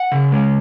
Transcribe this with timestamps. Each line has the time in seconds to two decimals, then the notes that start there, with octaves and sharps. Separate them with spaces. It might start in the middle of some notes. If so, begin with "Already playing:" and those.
Already playing: F#5
0.12 C#3
0.32 G#3